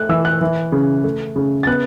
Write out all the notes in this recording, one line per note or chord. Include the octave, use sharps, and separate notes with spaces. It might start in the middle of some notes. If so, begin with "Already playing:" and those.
Already playing: A3 F#6
E3 E6
F#6
E3
C#3
A3
C#3
A6
B3 F#6